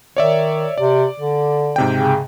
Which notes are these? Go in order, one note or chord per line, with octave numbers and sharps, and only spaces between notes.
D#3 C#5 D5 E5
C3 D5
D3
G#2 C3 G5
C#3